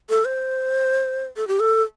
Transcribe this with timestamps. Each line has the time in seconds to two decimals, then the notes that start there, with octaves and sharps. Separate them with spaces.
0.09 A4
0.25 C5
1.36 A4
1.47 G4
1.60 A4